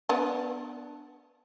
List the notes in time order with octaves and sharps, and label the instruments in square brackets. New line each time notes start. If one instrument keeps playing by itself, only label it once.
[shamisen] B3 D4